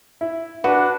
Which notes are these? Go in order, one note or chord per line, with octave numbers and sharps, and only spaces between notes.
E4
D4 F#4 B4